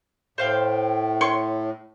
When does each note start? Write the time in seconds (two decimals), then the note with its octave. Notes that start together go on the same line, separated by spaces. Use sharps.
0.38 A2 C5 F5 G5
1.21 C#5 C6 C#6